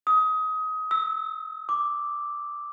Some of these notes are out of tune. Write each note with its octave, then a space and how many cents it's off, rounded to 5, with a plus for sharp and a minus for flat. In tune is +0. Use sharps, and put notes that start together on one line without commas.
D#6 +25
E6 -20
D6 +0